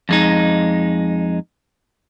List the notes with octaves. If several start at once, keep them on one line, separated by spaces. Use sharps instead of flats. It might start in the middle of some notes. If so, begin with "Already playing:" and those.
F2 G#3 D#4